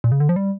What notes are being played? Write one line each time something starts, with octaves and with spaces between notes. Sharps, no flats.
A#2
C#3
D3
F3
G3